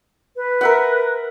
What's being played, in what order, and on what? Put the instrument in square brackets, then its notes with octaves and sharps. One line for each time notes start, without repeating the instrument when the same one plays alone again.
[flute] B4
[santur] A#4 E5 F#5